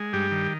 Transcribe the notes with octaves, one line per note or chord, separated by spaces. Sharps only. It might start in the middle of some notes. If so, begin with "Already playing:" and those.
Already playing: G#3
G2 G3 G4
D#3